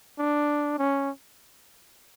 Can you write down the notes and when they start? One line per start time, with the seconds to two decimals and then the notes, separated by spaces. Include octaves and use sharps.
0.19 D4
0.79 C#4